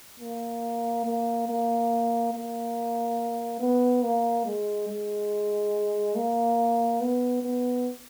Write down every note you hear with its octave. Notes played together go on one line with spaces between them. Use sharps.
A#3
A#3
A#3
A#3
B3
A#3
G#3
G#3
A#3
B3
B3